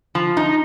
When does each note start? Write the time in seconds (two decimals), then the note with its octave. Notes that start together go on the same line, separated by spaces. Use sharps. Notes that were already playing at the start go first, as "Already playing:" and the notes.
0.15 F3
0.37 D#4